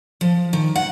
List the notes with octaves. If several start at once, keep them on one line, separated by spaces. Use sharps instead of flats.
F3
D#3
F#5